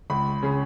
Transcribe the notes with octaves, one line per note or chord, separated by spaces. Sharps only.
C#2 B5
C#3